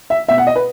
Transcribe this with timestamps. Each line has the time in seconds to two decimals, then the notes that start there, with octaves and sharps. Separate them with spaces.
0.10 E5
0.29 B2 E5
0.38 F#5
0.47 D#5
0.56 B4